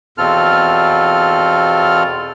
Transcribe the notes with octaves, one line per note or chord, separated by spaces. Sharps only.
E2 B2 C4 F4 A4 F6